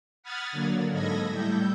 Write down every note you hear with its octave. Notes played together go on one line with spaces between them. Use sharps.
F#5 B5 D#6 F6 G#6 A6
D3 F#3 A#3
G#2 A4 D#5 B5 G#6 A#6
A2 G3 E4 A4 G6